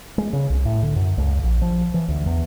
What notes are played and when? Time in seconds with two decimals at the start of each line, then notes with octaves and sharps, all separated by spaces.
0.18 G#3
0.33 C#3
0.50 C2
0.65 A2
0.83 D3
0.96 F#2
1.18 C#2
1.43 A#1
1.62 F3
1.94 E3
2.08 D2
2.26 E2